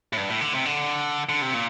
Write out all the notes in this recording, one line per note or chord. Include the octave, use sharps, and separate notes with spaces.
A2
G2
A2
D3
C3
D3
D3
C3
A#2